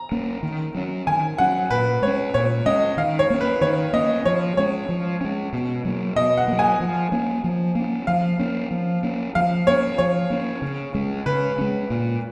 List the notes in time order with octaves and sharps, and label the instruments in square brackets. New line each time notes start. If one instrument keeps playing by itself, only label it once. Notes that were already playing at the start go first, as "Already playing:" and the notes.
Already playing: [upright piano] A#5
[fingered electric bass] A#3 C#4
D#3
F#3 C#4
[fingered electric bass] D#3 [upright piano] G#5
[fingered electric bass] F#3 C#4 [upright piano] F#5
[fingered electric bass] A#2 [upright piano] B4
[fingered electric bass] G#3 C#4 [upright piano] C#5
[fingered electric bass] A#2 [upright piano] C#5
[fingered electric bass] G#3 C#4 [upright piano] D#5
[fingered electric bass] D#3 [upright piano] F5
[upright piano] C#5
[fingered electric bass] A#3 C#4
[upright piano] B4
[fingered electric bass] D#3 [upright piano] C#5
[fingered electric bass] A#3 C#4 [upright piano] D#5
[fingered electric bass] F3 [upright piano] C#5
[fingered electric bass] G#3 C#4 [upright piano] C#5
[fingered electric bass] F3
G#3 C#4
B2
F#3 A#3
[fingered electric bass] B2 [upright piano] D#5
[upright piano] F#5
[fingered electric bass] F#3 A#3
[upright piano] G#5
[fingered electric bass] F3
A#3 C#4
F3
A#3 C#4
[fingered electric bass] F3 [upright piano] F5
[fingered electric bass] A#3 C#4
F3
A#3 C#4
[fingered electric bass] F3 [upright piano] F5
[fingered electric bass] A#3 C#4 [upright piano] C#5
[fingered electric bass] F3 [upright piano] C#5
[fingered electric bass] A#3 C#4
C#3
G#3 C#4
[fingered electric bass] C#3 [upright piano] B4
[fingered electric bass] G#3 C#4
A#2